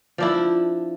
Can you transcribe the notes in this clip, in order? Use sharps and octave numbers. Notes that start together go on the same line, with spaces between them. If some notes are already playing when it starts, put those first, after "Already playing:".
F3 D4 E4